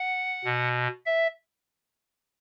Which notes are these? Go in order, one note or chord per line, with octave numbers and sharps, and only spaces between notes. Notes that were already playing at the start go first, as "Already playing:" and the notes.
Already playing: F#5
B2
E5